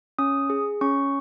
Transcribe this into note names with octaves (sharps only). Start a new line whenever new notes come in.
C#4 D#6
G#4
C#4 C#6